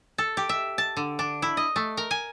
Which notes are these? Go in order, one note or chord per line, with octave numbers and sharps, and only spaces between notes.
A4
G4
E5
A5
D3
D4
E4
D#5
A3
A#4
G#5